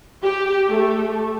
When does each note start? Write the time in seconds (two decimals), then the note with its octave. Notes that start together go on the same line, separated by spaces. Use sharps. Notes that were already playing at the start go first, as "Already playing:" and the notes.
0.23 G4
0.69 A3